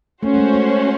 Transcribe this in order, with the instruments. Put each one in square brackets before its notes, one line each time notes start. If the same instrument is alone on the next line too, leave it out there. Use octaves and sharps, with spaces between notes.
[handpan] A3 [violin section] C#4 F#4 C5
[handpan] A3
G#3
A3